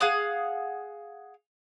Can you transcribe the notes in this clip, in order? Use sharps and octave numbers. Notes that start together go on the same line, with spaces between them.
G#4 F5 F#5 D#6